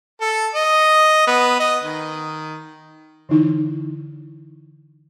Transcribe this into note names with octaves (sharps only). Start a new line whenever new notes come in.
A4
D#5
B3
D#5
D#3
D3 E3 D#4 E4